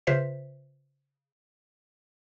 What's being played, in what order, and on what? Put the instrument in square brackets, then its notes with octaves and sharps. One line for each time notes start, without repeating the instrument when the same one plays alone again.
[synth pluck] C#3 F4 B4 C5 E5 B6